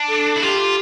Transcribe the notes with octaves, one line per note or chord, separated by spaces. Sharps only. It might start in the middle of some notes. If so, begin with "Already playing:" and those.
Already playing: D4
A4
E4
F4 G4